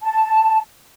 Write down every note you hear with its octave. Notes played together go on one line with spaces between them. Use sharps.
A5